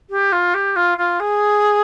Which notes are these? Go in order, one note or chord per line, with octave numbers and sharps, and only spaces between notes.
G4
F4
G4
F4
F4
G#4